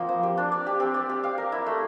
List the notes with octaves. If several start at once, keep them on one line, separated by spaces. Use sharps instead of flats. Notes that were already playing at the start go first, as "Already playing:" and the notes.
Already playing: F3 A#3 C4
C5
G4
D4
D5
G4
C4
D5
G4
F5
A#4
E4
A3